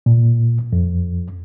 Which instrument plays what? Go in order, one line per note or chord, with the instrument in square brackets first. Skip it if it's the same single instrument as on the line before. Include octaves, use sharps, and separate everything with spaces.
[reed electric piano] A#2
F2